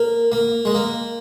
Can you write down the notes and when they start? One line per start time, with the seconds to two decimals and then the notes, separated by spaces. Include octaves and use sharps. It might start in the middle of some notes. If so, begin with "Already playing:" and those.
Already playing: A#3
0.32 A#3
0.65 G#3
0.74 A#3